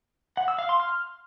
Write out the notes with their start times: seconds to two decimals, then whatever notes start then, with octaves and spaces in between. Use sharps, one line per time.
0.37 F#5
0.48 E6
0.59 F5
0.69 C6
0.80 F6